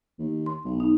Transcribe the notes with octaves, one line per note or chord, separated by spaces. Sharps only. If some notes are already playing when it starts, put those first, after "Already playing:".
D#2
C6
B1
D#4